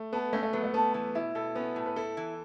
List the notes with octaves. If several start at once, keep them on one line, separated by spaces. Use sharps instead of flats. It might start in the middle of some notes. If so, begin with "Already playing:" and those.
Already playing: A3
B3 A4
A3 C#4
A3
F#3 B3
A3
B3 A4
E3
B2 E4
B2 A4
B3 C#4
A2
B4
E4 A4
E3